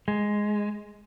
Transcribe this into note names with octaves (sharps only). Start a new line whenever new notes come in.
G#3